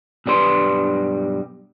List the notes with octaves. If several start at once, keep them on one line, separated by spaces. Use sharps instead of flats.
B1 G2 G3 B4 C6